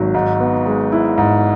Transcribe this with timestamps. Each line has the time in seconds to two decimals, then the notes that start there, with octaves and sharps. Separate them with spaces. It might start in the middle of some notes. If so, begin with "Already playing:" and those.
Already playing: G#1 F#3
0.14 G#2
0.40 B3
0.66 G#3
0.92 E4
1.18 G#2